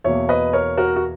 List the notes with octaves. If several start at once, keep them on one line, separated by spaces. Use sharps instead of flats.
E2 B2 A#3 C#5 E5
B4 D#5
A#4 C#5
F#4 A#4
F#4